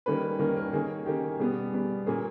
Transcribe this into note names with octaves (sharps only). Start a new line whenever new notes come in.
D#3 G3 A#3 C#4 B4
D#3 G3 A#3 C#4 A#4
A#4
D#3 A#3 C#4 G#4
D#3 A#3 C#4 G4
B2 G3 B3 G#4
B2 G3 B3
A#2 A#3 C#4 G#4